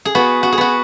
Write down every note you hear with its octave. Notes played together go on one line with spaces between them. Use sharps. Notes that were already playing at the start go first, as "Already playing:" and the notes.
G#4
B3 F#4
F#4
G#4
B3 F#4